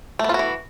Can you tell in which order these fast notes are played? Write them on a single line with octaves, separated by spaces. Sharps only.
A3 B3 F4 F#4 E3